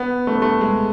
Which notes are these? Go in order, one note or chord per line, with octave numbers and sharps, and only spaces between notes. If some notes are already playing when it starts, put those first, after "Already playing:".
Already playing: B3
A3
B3
A3
G#3